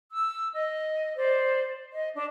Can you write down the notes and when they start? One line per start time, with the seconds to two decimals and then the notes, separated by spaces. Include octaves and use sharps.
0.10 E6
0.53 D#5
1.17 C5 D5
1.93 D#5
2.14 D4